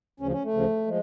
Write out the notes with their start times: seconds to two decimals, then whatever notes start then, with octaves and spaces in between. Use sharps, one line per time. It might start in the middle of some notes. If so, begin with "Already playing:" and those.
0.20 D2 C#3 F3 C#4
0.31 C#4
0.43 A3
0.53 D2 C#3 F3
0.87 F3 G#3